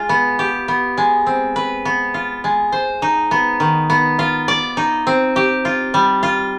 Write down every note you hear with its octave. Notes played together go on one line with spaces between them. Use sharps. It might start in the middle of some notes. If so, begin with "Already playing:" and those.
Already playing: G#3 F4
B3
G4
B3
G#3
C4
B4
B3
F4
G#3
C5
D#4
B3
D#3
B3
F4
D5
D#4
C4
G4
F4
G3
F4